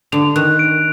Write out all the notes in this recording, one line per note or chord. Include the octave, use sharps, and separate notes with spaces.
D3 F7
D#3 F#6
D7